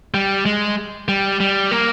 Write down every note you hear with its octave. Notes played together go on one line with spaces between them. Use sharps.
G3
G#3
G3
G3
A#3